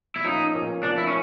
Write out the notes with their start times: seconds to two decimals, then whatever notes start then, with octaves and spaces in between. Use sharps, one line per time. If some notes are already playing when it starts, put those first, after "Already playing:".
0.16 E4
0.24 A#2 F3 A#3 C#4 D#4
0.54 A#2 F3 A#3 C#4
0.83 A#2 F3 A#3 C#4 D4
0.98 E4
1.07 C#4